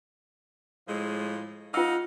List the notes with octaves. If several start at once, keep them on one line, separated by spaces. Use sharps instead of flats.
A2 F3 G#3
D#4 F4 F5 F#5 E6